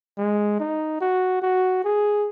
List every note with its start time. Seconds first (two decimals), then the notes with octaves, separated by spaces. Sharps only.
0.18 G#3
0.59 D#4
1.01 F#4
1.42 F#4
1.84 G#4